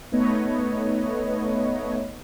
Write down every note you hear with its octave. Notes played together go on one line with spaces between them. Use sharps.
A3 B3 D#4 B4 C#5 D#5